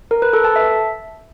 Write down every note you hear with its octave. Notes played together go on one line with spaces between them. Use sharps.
A#4
B4
A4
A5
E5